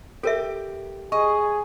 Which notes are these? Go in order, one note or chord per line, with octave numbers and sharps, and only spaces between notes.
G4 A4 A#4 E5
G#4 D#5 C#6